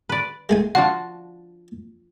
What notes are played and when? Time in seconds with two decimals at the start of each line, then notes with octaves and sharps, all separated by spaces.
0.09 B4 D5
0.49 G#3 A3 G#5
0.75 F3 D4 F#4 F#5